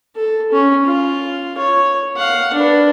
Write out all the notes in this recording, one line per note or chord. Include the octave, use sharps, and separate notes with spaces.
A4
C#4
F4
C#5
F5 F#5
D4 B4